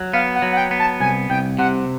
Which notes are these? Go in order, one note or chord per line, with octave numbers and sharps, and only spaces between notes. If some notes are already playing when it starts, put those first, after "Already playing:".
Already playing: F#3
B3 F5
F#5
F#3
F#5
G5
B3
A5
C2 G#5
C2 G5
C3 F#5